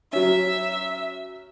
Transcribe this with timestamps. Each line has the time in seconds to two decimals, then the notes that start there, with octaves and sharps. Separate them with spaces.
0.13 F#3 C#4 E5